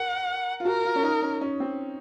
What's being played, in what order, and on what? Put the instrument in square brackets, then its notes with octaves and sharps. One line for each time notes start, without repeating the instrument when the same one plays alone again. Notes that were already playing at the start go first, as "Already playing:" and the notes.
Already playing: [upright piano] A#4 [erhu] F#5
[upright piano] F4
[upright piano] F#4 [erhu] A#4
[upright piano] F4
C#4
D#4
C#4
C#4
C4